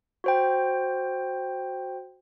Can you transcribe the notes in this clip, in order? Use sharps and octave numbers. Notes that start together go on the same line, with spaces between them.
F#4 C5 G5